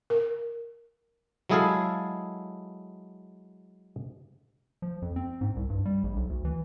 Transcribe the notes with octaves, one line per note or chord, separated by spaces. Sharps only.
A#4
F#3 G#3 E4 G#4 A4 F5
F3
F2
C4
G#2
C2
G2
G3
A#1
B1
D2
E3